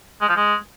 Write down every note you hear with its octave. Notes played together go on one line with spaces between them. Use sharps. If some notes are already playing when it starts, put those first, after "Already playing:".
G#3
F3
G#3